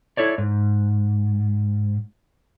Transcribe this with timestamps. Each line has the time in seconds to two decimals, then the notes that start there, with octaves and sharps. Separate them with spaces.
0.17 E4 A4 C#5 D5
0.38 G#2